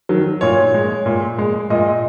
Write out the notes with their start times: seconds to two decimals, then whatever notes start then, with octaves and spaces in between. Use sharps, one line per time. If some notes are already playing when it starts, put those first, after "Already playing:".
0.09 D#3 F#3
0.41 A#2 C#5
0.74 G#3
1.06 A#2
1.38 G#3
1.70 A#2 D#5